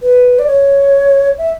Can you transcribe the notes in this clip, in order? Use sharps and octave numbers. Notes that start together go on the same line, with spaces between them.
B4
D5
C#5
E5